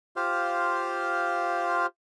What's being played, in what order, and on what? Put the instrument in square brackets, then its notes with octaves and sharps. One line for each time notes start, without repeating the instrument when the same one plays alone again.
[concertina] F4 G4 C5 F5